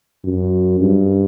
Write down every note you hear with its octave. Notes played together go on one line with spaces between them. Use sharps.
F#2
G2